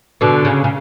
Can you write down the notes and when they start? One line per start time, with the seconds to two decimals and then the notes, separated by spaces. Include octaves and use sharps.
0.21 B2 D3
0.45 C#3
0.64 C#3